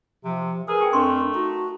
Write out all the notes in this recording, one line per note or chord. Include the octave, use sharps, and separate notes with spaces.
C3 F3
G#4 A#4 B4 E6
G4 G5
F2 A3 D4 A#4 C6 C#6
D#4 F#4